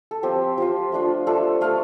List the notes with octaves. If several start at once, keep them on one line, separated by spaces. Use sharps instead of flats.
A4
F3 C4 F4 G4
F3 C4 F4 G4
A3 D4 F4
A3 D4 F4 A4
A3 F4 F5